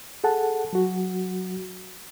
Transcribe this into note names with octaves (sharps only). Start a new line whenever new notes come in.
G#4 A4 F#5 A5
F#3 F#4